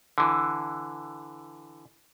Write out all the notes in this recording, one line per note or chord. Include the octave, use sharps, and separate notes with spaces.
D3 E3